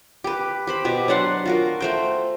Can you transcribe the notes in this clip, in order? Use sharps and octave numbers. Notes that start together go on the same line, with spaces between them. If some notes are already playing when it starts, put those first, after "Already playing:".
G4 B4
G4 C5 B5
B2 G4 B4
F#3 D4 F#5 C6
F4 F#4 A#4
A3 C5 G5